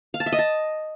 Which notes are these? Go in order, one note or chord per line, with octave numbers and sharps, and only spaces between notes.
F5
A5
E5
D#5
A5